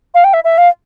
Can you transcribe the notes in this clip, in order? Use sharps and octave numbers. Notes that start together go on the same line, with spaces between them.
F5
G5
E5
E5
F5